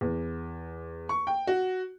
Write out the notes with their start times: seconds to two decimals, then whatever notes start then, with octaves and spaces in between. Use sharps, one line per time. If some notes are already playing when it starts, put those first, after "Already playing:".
0.01 E2
1.09 C#6
1.27 G5
1.47 F#4